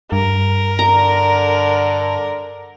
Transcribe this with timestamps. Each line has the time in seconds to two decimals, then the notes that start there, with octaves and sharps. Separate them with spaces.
0.12 G2 A#4
0.79 D3 A#5